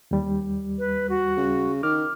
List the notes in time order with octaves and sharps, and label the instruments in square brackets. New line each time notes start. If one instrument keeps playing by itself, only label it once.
[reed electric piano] D#2 G3
[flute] B4
F#4
[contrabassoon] C#3
[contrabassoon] D#3 [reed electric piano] D6 F6